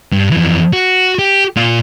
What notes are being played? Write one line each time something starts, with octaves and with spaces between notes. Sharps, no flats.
G2
F2 E3
F#4
G4
A#2 F4